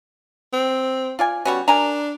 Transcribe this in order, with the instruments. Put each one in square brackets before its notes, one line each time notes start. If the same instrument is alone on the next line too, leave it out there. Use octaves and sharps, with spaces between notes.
[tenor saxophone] C4
[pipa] F4 D5 G#5
[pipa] G3 B3 C#4 [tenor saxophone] F#4
[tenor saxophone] D4 [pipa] A#4 G#5 A#5